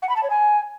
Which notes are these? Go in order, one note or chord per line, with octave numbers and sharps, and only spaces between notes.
F#5
B5
A5
C#5
G#5